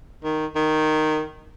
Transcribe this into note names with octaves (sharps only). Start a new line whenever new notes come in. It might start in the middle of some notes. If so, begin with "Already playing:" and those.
D#3
D#3